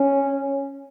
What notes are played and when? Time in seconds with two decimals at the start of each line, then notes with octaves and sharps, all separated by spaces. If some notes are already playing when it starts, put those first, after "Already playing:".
Already playing: C#4